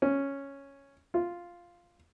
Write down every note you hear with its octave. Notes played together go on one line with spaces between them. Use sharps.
C#4
F4